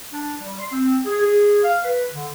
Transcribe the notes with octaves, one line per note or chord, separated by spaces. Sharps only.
D4
G3
C6
C4
G#4
G#4
F5
B4
D3